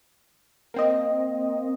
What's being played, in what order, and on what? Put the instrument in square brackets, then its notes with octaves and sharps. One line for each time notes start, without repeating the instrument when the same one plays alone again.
[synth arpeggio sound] A#3 C4 D#5